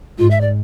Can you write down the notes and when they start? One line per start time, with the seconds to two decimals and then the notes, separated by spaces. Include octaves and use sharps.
0.18 G#2 F4
0.31 E5
0.41 D5